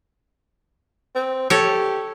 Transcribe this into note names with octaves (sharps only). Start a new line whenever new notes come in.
C4
G4 A4 C#5